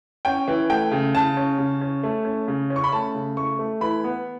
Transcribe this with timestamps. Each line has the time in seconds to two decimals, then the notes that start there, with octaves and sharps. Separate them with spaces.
0.25 C#4 G5
0.48 E3
0.70 A3 G5
0.91 C#3
1.14 C#3 A5
1.37 C#4
1.58 C#3
1.81 C#4
2.03 A3
2.25 C#4
2.48 C#3
2.70 C#4
2.76 C#6
2.84 B5
2.92 A3 A5
3.15 C#3
3.37 A3 C#6
3.59 A3
3.81 E3 B5
4.04 B3